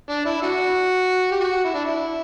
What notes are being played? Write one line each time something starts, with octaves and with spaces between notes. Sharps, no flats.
D4
E4
D4 F#4
G4
F#4
E4
D4
E4